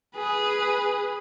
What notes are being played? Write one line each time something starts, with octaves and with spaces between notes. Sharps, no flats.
G#4 B4